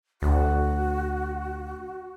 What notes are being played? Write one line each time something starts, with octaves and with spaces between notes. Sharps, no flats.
D2 F#4